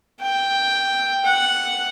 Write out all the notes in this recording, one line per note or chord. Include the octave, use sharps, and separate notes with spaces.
G5
F#5